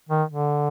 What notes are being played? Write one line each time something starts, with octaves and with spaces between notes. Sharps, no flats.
D#3
D3